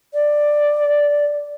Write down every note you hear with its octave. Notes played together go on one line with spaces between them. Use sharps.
D5